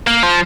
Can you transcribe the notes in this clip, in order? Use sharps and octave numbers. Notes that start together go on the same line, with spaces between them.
A#3
F3